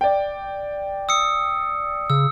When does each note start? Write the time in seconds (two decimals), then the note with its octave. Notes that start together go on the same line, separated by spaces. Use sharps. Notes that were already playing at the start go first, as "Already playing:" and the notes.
0.01 D5 G5
1.09 D#6 E6 C#7
2.10 C#3 E6